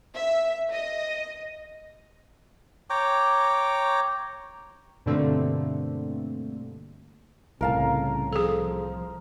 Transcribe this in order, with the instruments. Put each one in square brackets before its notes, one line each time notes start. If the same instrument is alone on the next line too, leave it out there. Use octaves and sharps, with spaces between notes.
[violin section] E5
D#5
[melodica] C#5 G5 A#5 D6
[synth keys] G2 B2 D3 A3 A#3 C4
[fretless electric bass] C2 A2 [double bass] C#3 [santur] A#4 F5 A5
[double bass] F3 [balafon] G#4 A4